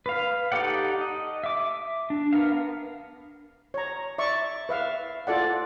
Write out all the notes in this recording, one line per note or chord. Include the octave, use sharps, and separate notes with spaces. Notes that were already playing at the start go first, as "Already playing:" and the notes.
B4 F5
D#4 G4 A4 D5 F#5
D#5
E5 D6
D4
B3 A#4 F5
C#5 A#5
D5 E5 C#6
B4 E5 F5
F4 A4 D5 F#5